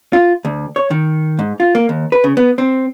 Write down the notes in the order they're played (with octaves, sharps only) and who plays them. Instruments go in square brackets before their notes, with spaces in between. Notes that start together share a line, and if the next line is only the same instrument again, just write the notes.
[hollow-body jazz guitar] F4
D2
C#5
D#3
G#2
F4
A#3
D#2
B4
C#3
B3
C4